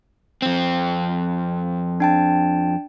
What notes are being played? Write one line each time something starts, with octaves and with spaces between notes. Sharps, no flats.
F2 C4
D4 G5 A5